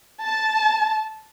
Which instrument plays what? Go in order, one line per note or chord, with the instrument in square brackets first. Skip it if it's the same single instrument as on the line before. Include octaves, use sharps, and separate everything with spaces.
[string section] A5